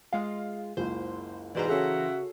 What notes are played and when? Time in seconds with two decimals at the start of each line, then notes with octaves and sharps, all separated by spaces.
0.13 G#3 F4 F5
0.77 F#1 C#2 C5
1.55 G#2 B2 E3 C5 D5 A#5
1.69 C#3 F#4 G#4 A4 C#5 E5 F#5